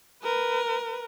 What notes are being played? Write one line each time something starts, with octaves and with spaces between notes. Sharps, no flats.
A#4 B4